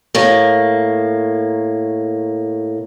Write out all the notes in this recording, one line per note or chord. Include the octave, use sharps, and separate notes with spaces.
A2 A#3